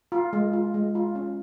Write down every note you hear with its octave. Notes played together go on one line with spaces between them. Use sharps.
F4
G#3
F4
G#3
F4
C#4